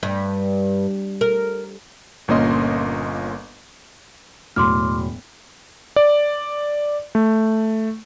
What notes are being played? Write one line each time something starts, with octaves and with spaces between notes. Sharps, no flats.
G2
A#4
G1 A#2 A#3 C#4 D#5 C6
E1 A2 F#3 C6 D6 F6
D5
A3